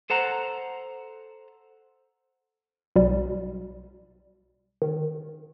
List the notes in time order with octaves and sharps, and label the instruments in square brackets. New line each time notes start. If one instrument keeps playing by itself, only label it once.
[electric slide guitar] A4 C5 F#5 A#5
[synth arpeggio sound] B1 B2 G3
D#3